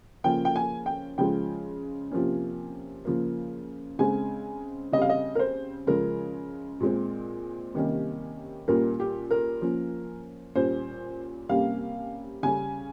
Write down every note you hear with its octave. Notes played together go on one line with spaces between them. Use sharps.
C#3 F3 A#3 C#4 G5
G5
G#5
G5
C#3 F3 G#3 G5
C3 F3 A#3 C#4
C#3 F3 A#3
C#3 G#3 C4 G#5
C#3 G3 C4 D#5
F5
D#5
A#4
C5
C#3 F3 G#3 C#4 A#4
A#2 G#3 C4
C3 D#3 G3 A#3 C#4
A#2 G3 A#3 C#4 A#4
G4
A#4
F3 A#3 C#4
A#2 G3 C#4 C5
C3 G3 A#3 C#4 F5
C#3 G3 C#4 G#5